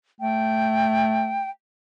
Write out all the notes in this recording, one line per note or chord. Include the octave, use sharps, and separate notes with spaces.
A3 G5